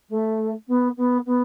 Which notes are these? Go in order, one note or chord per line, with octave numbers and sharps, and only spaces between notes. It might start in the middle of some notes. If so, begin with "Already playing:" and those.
A3
B3
B3
B3